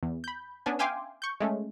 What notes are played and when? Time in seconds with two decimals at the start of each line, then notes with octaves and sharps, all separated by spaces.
0.03 E2
0.24 B5 G6
0.66 B3 C#4 D4 G#5
0.79 E5 F5 G5 G#5 C6 D6
1.22 C#6 G6
1.40 G#3 A3 C#4